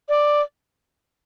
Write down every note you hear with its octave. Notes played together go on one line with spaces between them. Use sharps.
D5